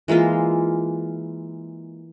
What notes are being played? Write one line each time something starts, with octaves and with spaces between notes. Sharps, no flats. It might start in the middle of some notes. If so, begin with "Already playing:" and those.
E3 G#3 A#3 F4